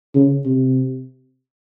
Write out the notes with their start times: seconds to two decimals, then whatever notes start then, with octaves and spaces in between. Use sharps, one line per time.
0.15 C#3
0.45 C3